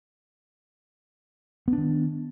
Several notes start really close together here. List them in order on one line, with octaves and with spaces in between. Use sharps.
B3 D4 D#3